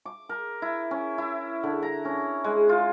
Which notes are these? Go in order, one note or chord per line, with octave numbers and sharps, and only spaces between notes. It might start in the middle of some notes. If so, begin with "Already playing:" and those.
D6
A#4
E4
C#4
E4
D3
A#5
C#4
G#3
F4